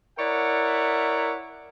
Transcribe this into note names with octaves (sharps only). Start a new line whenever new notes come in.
E4 A#4 C#5 D5 E5 F#5